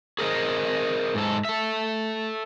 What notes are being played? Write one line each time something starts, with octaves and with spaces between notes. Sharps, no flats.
G#4 A#4 C5 D#5
G#2 A4
A4 E5